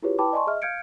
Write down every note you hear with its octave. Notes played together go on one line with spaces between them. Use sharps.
E4 F4 G4 G#4 B4 C#5
E4 B4 G5 A5 B5 D6
D5 D#5 G#5 A5 C6 C#6
G#4 D#5 E5 F6
F5 F6 G6 G#6 C#7 D7